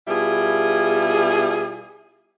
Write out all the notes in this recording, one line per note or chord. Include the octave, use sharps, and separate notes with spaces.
B2 G3 E4 F4 G#4